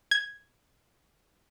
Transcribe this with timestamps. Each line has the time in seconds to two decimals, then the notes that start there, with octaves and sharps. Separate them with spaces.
0.11 G#6